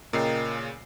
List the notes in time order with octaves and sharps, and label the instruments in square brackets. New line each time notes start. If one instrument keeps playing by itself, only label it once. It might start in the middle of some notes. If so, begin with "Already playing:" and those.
[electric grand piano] A#2 C#3 C7 [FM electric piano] A#4 D#5 G5